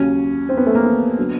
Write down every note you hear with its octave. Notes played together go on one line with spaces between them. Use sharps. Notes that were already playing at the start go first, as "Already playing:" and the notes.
Already playing: D#2 C#3 F#3 C#4
C4
B3
A3
A#3
B3
D3 F#3